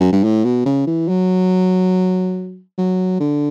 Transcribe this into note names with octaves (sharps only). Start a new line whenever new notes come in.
F#2
G2
A2
B2
C#3
E3
F#3
F#3
D3